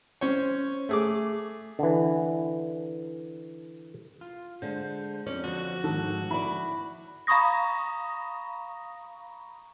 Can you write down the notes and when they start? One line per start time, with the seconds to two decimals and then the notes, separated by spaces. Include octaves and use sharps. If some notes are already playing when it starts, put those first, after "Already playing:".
0.21 C#4 C5 C#5
0.89 A3 G#4 D6
1.79 D3 E3
4.21 F4
4.62 D3 G#3 C5
5.26 F2 C#4 D5
5.44 D3 F3 F#4
5.84 G#2 D#3 A4
6.31 E4 D5 B5
7.27 F5 A#5 B5 C#6 D#6 A#6